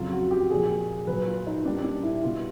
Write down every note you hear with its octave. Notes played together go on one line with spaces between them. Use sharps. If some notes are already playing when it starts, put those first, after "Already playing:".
Already playing: F2 C#3 F#3 F4
F#4
G4
A#2 F3 G#4
A#2 F#3 B4
F4
D#4
A#2 G3 D4
D4
E4
B2 G3 F4